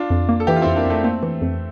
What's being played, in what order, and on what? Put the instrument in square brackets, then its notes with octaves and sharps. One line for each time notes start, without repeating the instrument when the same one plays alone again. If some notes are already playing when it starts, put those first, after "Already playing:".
Already playing: [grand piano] D4 F4
[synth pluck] F2
A#3
[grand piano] A4
[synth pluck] E3 [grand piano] E4 G4
[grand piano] F4
[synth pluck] F2 [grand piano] C4 E4
[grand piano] A#3 D4
[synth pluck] F2 [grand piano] A3 C4
[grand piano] A3 C4 [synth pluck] A#3
[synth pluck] E3
F2